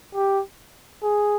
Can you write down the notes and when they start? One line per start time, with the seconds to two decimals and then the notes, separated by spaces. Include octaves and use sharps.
0.14 G4
1.03 G#4